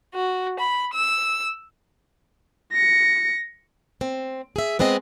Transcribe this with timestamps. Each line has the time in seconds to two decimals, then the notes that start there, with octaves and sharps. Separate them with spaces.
0.14 F#4
0.58 B5
0.93 E6
2.73 A#6 C#7
4.01 C4
4.56 G#4 E5
4.79 G#3 B3 C4 G#4 D#5